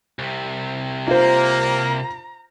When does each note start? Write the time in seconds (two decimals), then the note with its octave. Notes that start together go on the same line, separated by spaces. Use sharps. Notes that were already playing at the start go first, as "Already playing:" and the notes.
0.19 C2 C3
1.08 A#3 F4 C5 A#5